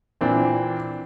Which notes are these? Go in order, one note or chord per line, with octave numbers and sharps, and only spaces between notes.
A#2 E3 C4 D4